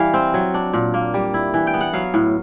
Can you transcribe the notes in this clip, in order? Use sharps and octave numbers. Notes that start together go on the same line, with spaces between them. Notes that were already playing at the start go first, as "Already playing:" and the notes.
Already playing: E3 G3 F5
C4
F#3
D4
A#2
A#3
G3
E4
E3
G5
B3
F#5
F#3 F5
A2